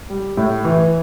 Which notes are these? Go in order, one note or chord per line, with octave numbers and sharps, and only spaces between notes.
G3
A2
E3